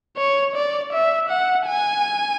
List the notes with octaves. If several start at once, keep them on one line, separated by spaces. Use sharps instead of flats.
C#5
D5
E5
F#5
G#5